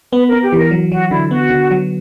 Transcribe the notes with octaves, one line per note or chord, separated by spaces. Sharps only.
B3 B4
B3 A#4
G4
E3 A#4
F#3
F#3 F#4
D3 E4
B3 F#4
D3
F#3